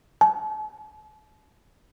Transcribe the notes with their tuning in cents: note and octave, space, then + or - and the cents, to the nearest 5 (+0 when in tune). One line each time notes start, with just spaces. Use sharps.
A5 -45